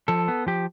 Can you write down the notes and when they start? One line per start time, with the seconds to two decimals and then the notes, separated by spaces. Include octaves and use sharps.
0.08 F3 A4
0.28 B3
0.47 F3 G4